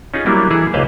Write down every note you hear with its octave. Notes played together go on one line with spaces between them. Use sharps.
C#4 D#4 F4 G#4
F#3 G3 A#3 D4 E4
E3 E4 G#4 A4
C#2 A#3 B4 C5 D#5 F5